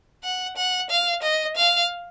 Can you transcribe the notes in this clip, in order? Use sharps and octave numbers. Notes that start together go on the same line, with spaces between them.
F#5
F#5
F5
D#5
F5